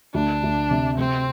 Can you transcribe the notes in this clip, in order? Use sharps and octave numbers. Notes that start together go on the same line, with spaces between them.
D2 D4
D2
C3
C3 C4